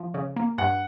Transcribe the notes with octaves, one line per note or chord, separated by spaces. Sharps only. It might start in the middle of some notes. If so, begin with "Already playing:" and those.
Already playing: F3
C#3
A#3
G2 F#5